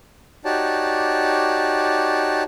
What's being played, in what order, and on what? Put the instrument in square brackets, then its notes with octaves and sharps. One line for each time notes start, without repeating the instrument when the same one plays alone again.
[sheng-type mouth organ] D#4 F#4 G4 C#5 D5 A5